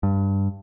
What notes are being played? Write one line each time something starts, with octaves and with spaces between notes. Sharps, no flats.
G2